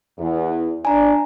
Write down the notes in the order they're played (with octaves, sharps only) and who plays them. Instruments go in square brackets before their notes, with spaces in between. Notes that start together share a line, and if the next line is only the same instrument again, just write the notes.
[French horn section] E2
[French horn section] D4 [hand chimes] G#5 A#5